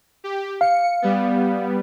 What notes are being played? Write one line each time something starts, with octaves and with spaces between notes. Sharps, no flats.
G4
F5 C#7
G3 B3